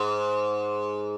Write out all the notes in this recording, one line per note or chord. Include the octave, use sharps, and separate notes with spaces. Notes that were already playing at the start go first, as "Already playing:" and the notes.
Already playing: G#2